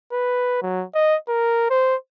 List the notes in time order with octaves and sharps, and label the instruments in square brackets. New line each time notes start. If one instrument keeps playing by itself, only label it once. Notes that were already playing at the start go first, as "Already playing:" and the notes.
[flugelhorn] B4
F#3
D#5
A#4
C5